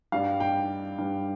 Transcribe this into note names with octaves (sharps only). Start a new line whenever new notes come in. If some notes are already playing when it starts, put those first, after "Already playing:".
G2 G3 F5
G5
G2 G3